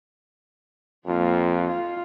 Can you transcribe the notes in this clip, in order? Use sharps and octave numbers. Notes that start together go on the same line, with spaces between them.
F2 A#3 F4
F4